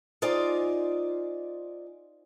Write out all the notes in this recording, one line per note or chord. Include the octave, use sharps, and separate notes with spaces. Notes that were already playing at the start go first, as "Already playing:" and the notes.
D#4 F4 G#4 C5 D5